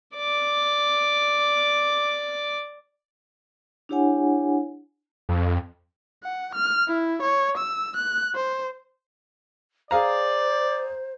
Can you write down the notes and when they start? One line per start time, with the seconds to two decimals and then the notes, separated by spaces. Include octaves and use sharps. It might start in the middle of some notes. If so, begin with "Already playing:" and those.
0.16 D5 D6
3.89 D4 E4 G4 C#5 F#5 G#5
5.29 F2
6.24 F#5
6.55 F6
6.88 E4
7.22 C#5
7.57 E6
7.97 F#6
8.35 C5
9.91 G#4 C5 D5 F5 A#5